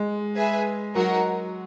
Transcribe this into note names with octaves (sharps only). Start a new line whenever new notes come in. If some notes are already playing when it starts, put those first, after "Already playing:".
Already playing: G#3
G#4 B4 E5 G#5
F#3 D#4 F#4 A#4